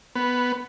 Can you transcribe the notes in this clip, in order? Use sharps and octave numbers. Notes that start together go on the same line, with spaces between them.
B3